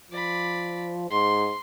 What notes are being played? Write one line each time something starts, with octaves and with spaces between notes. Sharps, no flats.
F3 D5 B5
G#2 C6